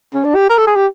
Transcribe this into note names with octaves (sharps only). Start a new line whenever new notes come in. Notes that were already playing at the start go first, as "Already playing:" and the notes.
C#4
D4
G4
A#4
A4
G#4
G4